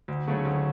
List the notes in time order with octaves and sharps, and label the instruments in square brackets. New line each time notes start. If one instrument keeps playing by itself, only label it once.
[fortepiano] D2
C#3 F#3 A3 C#4
D2